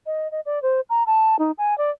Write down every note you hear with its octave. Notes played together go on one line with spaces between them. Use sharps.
D#5
D#5
D5
C5
A#5
A5
D#4
G#5
D5